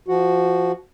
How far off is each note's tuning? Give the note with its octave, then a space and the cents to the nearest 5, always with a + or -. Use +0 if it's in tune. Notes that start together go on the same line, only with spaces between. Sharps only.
F3 -15 F#4 +0